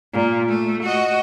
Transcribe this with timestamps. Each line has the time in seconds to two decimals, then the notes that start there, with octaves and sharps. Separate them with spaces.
0.14 A#2
0.48 A3
0.83 F#4 D#5